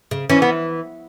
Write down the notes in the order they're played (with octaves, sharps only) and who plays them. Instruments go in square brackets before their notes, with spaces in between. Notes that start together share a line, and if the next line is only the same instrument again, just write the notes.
[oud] C#3
[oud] E3 [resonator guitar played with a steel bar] C#4
[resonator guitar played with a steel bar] B3